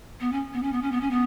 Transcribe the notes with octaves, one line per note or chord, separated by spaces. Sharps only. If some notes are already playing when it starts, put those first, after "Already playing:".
B3
C#4
B3
C#4
B3
C#4
B3
C#4
B3